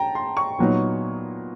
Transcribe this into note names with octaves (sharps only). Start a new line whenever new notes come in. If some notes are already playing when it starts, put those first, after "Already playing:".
Already playing: G5 A5 A#5
C6
C#6
A#2 F#3 B3 D#4